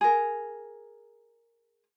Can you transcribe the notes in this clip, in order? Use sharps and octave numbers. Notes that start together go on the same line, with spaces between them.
G#4 A#4